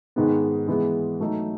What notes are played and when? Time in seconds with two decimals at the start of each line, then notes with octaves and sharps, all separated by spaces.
0.16 G#2 D#3 G#3 B3
0.67 E3 G#3 B3
1.20 F#3 A3 D#4